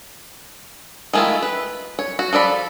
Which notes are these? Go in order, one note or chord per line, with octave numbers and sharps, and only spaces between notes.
D#3 G#3 A3 E4 F4
B4
C#5
F#4
F3 A4 D5 B5